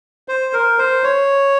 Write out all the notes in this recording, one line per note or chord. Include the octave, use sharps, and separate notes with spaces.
C5
A#4
C5
C#5